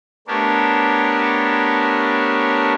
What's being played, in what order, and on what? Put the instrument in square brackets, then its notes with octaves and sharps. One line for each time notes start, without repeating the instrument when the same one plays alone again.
[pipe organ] A3 B3 D4 G4 A#4 C#5